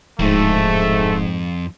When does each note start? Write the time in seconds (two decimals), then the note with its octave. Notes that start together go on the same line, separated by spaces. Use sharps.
0.19 D1 F2 G#2 A3